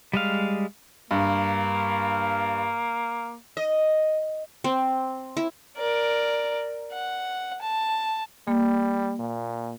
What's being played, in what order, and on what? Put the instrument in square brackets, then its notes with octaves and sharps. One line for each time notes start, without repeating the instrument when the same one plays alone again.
[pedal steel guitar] G3 G#3 F5
[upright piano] G2 [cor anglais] A#3
[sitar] D#5
[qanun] C4
E4
[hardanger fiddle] A#4 D5
F#5
A5
[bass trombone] G3 [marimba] A#3
[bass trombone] A#2